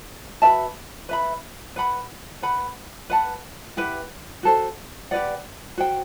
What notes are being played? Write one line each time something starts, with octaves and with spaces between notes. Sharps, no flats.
F#4 B4 E5 A5
B4 E5 B5
B4 F#5 B5
B4 F#5 B5
B4 F#5 A5
E4 G4 B4 F#5
F#4 A4 C5
G4 B4 D5 F#5
F#4 C5 G5